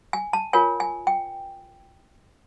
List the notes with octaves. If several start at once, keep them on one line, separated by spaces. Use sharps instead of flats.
G#5
A5
F4 A#4 C#5 G#5
G#5
G5